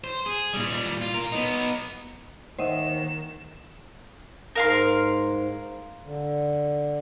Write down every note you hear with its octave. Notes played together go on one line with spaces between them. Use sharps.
C5
G#4
A#2 G3
F4
F4 A#4
B3 D#4
D#2 D#3 C5 D#5 E5 F#5 E7
G#2 A#4 F5 C6
D3